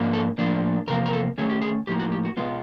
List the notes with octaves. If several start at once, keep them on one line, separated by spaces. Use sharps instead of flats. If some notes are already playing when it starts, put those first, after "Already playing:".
Already playing: G#2 F3 A#3 D4
A4
A2 F3 A#3 D4
E2 C3 F3 A#3 A#4
A#4
A4
D#3 F#3 A3 C#4 G#4
G4
G#4
A2 F3 A#3 D#4 G4
F#4
G4
F#4
B2 G#3 B3 F4